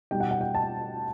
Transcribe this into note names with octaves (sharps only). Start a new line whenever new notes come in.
B2 G3 D#4 G5
F#5
F#5
G5
A5